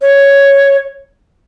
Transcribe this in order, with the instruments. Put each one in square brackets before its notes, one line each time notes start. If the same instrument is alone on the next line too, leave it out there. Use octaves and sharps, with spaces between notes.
[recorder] C#5